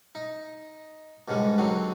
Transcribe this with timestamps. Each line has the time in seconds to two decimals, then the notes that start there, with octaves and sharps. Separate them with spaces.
0.15 D#4
1.28 C#2 G#2 D3 G3 G#3
1.58 D3 D#3 F#3 C4